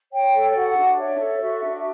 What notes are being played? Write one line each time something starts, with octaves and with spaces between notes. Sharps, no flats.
C#5 G5
A4
F#4 F#5
D4
C#5 E5
A4
F#4
D4